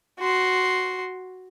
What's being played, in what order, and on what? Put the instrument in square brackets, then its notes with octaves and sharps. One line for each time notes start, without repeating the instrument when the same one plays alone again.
[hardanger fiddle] F#4 C6